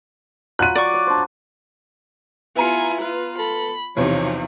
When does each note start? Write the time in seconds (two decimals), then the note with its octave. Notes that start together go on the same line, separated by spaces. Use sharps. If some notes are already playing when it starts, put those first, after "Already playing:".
0.59 F#3 F4 B5 F#6 D#7
0.75 D5 C#6
0.94 C#5
1.07 D4 C5
2.56 B3 E4 F4 G#5 A#5 C#7
3.01 F4 B4
3.38 A4 B5
3.97 B1 E2 C3 F3 D#4 C#5